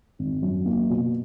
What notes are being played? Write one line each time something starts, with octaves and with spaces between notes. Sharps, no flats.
G#1
F#2
A#3
B2